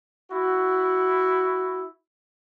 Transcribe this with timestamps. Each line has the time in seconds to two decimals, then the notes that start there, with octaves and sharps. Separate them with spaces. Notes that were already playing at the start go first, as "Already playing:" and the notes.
0.31 E4 F#4